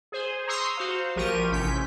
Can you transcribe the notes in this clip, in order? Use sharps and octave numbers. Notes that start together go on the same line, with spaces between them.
G#4 C5
A#5 C6 C#6 D#6 E6 C7
F#4 C5 F5
A#1 F3 G4 A#4 C#6 D#7
A1 C3 C#4 G6 B6